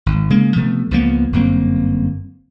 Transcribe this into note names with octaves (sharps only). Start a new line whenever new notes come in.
G#1
C#3 G#3 A#3
C3 F3 A3 B3
C#2 F3 A#3 B3
G1 F#2 A#3 C4